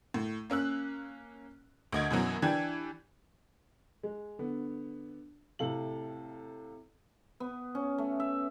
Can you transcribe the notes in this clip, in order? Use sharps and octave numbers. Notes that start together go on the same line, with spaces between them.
A2
A#3 C#4 E6 F#6
D2 D#5 G#6
F#2 B2 E3 F#3
E3 D4 G4 G#6
G#3
D3 B3
A2 C3 A4 F5 F#7
B3
C#4
A3
E5